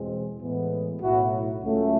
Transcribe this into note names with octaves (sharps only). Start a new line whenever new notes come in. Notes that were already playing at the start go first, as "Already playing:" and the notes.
Already playing: E2 B2 G#3 C4
A2 E3 G#3 B3
B1 A2 F#3 E4 F#4
C#2 C#3 F#3 A3